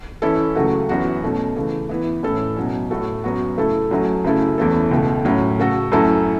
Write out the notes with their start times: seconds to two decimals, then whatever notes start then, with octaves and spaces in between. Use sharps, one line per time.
0.22 E3 C#4 E4 A4
0.55 C#2 C#3 F#3 A3 F#4
0.89 F#2 E3 B3 F#4
1.22 B2 A3 C#4
1.56 C#3 E3 A3
1.89 E3 B3 E4
2.23 A2 E3 C#4 E4 A4
2.56 B2 F#3 C#4
2.91 A2 A3 F#4 A4
3.24 F#2 F#3 B3 F#4
3.57 C#3 A3 E4 A4
3.91 F#2 F#3 A3
4.24 F#2 C#3 A3 E4 A4
4.58 E2 E3 A3 C#4 A4
4.91 C#2 B2 A3
5.25 A2 F#3 C#4
5.59 C#3 A3 F#4 A4
5.92 F#2 F#3 A3 E4 A4